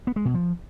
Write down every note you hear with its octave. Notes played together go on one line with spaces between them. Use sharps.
B3
G#3
B2
F3